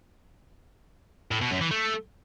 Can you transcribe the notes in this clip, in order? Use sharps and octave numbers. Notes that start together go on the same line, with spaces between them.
A2
B2
F#2
E3
A3